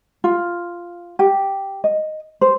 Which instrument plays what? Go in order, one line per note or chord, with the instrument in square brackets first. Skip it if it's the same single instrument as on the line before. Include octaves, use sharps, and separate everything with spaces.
[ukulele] F4
G4
D#5
C5